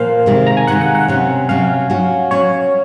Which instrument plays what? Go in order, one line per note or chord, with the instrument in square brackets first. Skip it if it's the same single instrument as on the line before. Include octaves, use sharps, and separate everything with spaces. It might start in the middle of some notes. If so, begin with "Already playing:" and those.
Already playing: [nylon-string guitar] A#2 F3 [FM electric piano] A#4 C5 F5
[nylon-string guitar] C3 D#3 G#3
[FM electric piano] A#5
G#5
[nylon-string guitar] C3 D#3 G#3 [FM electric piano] F#5
[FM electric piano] F#5
F#5
[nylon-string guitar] C3 F#3 C#4
[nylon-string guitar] C3 F#3 C#4 [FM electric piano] F5
[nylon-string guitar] F#3 C#4 F#4
[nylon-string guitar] F#3 C#4 F#4 [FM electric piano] C#5